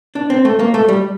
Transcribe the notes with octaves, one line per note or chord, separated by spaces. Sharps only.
D4
C4
A3
A#3
A3
G3